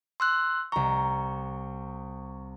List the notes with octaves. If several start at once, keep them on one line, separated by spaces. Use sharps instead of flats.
C6 E6 F#6
C2 A#5 C#6